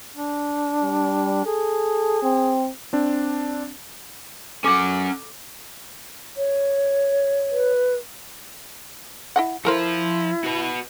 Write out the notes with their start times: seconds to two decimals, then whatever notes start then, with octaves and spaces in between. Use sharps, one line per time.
0.16 D4
0.83 G3
1.46 G#4 A4
2.23 C4
2.93 C4 D4
4.64 C#4 A4 F#5 D6
6.35 C#5
7.51 B4
9.36 E4 D#5 F#5
9.65 F3 E4 A4 A#4 C5 F5
10.44 F#4 B4